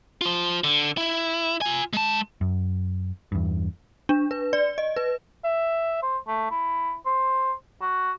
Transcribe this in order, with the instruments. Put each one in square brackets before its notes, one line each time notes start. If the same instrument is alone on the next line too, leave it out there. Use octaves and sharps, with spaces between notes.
[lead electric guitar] F4 C5
D3
E4
F4 G#5
G#3 A5
[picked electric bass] F#2
E2 G2
[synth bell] D4
B4
D5
D#5
B4
[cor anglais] E5
C5
A3
E4
C5
F#4